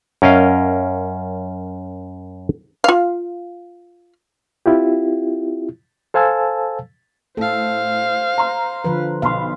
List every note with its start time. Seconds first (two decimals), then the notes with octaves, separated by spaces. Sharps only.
0.22 F#2 C#4 A#4 D#5 F5
2.84 F4 F5
4.66 C4 E4 F4 G4
6.14 A4 C5 F5 G#5 A5 E6
7.37 A2 A4 C5 F5
8.38 A#5 C6
8.84 D3 F3 B4
9.22 B1 F5 B5 C6